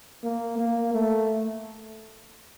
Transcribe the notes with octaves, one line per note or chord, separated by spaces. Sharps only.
A#3
A#3
A3